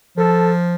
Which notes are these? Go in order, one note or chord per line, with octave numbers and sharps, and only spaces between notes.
F3 A4